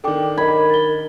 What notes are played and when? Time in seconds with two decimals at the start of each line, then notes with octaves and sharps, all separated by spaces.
0.04 D#3 D4 A4 G5 D6
0.38 A#4 D#5 B5 G#6
0.70 A6 G7